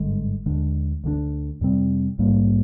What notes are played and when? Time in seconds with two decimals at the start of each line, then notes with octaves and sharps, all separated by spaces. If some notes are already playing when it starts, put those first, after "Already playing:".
Already playing: G#1 G2 D3 G#3
0.46 D#2 D3 G#3 D4
1.04 D2 D3 G3 D4
1.61 F2 C3 G3 C4
2.18 A#1 G#2 G3 A#3